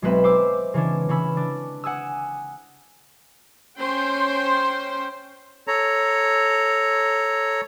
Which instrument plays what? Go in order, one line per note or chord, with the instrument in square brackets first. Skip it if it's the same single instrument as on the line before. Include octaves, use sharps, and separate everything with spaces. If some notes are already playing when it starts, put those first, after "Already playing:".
[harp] B1 G#3 C4 B4 E5 B5
C5 D6 E6
C#3 E3 C#4 D4
C#3 E3 C#4 B5 E6
D4
F#5 G#5 D#6 E6
[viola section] C#4 C5 G5 C6
[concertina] A4 C#5 A#5